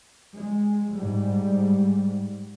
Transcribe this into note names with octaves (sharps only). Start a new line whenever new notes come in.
G#3
G#2 G3